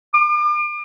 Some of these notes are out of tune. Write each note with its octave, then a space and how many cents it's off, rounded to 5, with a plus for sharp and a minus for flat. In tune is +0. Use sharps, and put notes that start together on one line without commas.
D6 +40